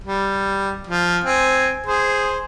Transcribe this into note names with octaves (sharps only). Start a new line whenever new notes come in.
G3
F3
C4 G#5
G#4 C5